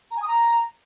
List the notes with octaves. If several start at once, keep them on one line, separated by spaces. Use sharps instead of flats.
A#5
G#5
D#6
A#5